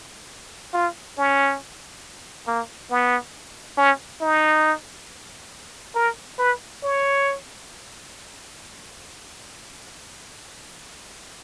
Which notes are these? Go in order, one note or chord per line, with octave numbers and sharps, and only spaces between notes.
F4
C#4
A#3
B3
C#4
D#4
A#4
B4
C#5